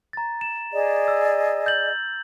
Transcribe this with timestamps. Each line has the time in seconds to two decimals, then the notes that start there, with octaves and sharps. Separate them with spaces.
0.13 A#5 A6
0.41 E7
0.73 G#4 D5 D#5
1.08 E6
1.66 G6 A6 F#7